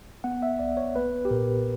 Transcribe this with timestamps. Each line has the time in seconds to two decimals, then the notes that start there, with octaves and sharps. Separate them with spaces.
0.24 B3 F#5
0.43 E5
0.59 B1 D5
0.77 C#5
0.96 A#3 B4
1.25 G4
1.31 A#2 A#4